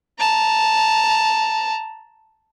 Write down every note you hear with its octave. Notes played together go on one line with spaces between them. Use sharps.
A5 A#5